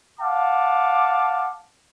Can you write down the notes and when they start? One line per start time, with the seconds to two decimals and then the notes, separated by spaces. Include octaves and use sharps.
0.20 F5 F#5 A5 D6